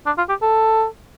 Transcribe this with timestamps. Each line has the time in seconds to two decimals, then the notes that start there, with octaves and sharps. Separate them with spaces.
0.06 D4
0.18 F4
0.29 G4
0.42 A4